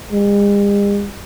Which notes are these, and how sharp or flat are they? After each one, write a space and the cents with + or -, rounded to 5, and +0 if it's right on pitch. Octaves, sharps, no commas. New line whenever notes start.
G#3 -45